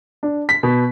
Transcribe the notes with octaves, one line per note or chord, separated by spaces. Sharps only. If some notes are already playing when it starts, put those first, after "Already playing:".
D4
B6
B2